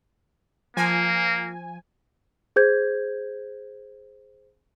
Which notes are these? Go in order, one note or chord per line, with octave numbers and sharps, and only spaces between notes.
F3 A#3 G#5
G#4 C5 G6 G#6